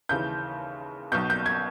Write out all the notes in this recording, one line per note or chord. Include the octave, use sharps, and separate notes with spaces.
D#2 C#3 E3 G6
B1 B2 G6
G6
G#6